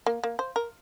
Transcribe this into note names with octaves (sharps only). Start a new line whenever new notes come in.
A#3
A#3
C5
A#4